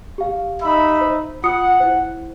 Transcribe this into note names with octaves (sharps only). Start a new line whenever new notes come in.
G4 F5
D#4 E5 B5
C5
F4 F#5 D#6 C#7
E4 C5